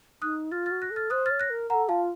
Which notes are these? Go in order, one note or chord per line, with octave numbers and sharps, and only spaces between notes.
D#4 D#6 F#6
F4 F6 A6
F6 A6
F#4
F#6 A#6
A4
F6 A6
C5 D#6 F#6
F6 A6
C#5
F#6 A#6
A#4
A#4 F#5 A#5
A4
F4 F5 A5